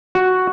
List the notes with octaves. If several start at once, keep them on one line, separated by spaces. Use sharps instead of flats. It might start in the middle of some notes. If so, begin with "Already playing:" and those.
F#4